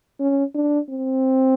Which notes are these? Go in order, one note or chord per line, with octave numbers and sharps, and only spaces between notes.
C#4
D4
C4